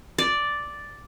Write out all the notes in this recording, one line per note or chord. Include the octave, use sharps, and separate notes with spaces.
D5